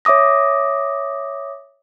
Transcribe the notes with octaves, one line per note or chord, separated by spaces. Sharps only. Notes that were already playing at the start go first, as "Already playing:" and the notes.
C#5 E5 D6 D#6 A#6